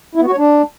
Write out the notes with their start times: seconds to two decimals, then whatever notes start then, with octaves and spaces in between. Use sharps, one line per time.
0.15 E4
0.21 B3
0.27 F#4
0.32 C#5
0.38 D4